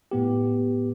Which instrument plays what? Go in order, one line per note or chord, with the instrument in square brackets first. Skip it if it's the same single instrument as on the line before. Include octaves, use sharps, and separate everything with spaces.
[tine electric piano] A2 B3 G4